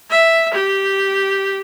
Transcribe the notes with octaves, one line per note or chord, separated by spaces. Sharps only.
E5
G4